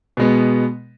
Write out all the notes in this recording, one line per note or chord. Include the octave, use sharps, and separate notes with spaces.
B2 G#3 B3